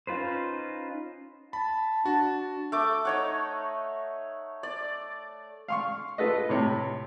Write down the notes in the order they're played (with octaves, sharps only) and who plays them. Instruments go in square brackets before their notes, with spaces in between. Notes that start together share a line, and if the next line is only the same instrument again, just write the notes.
[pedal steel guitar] C#4 D#4 F4 B4 C5
[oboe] A5 [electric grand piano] B5
[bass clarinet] D4 [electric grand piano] F#4
[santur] A3 D6
D#4 C#5 F#5
D5
[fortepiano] F5 C6 C#6
F4 A4 B4 D#5
A2 C3 C#5